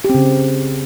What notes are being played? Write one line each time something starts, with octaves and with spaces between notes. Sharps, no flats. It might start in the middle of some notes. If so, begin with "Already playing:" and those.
G4
C4
C#3